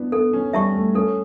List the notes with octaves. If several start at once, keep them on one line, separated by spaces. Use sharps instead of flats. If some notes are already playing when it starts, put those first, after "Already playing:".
Already playing: B3 D4 E4
B3 A4
C#4
G3 E5 A5 C#6
A3
C#4 A4